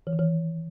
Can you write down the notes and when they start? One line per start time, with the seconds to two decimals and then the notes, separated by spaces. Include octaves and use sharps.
0.07 E3
0.13 D#3
0.19 E3